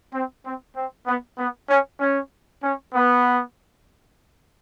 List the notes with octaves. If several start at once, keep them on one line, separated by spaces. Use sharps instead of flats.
C4
C4
C4
B3
B3
C#4
C#4
C#4
B3